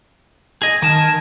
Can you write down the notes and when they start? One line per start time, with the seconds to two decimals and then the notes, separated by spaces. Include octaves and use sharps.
0.62 G#4 D#5
0.82 D#3 A#4 G#5 A5